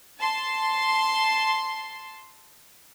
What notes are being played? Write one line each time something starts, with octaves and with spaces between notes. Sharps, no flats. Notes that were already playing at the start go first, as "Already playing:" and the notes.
A5 C6